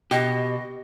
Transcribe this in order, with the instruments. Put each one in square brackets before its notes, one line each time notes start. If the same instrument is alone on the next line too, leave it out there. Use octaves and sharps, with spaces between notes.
[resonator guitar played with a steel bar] B2 [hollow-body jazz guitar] G4 [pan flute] D#5